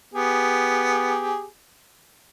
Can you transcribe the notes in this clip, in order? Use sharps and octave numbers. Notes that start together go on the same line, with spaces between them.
B3 G4 G#4